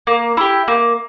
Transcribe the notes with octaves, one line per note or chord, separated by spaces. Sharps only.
A#3
E4 G4
A#3